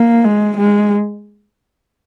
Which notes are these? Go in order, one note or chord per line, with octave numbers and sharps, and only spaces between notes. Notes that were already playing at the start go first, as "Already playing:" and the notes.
Already playing: A#3
G#3
G#3